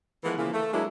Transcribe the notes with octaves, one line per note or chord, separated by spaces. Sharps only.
E3 F3 G#3 A3 B3 A#4
C#3 E3 F3 G#3 A#3
A3
F#3 G#3 A#3 D4 E4